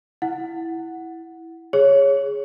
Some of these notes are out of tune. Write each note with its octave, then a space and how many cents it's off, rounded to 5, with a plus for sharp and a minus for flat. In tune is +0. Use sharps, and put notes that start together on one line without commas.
E4 +0 F#5 +0
G#4 +0 C#5 +0